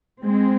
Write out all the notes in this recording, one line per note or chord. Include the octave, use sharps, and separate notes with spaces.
G#3 C4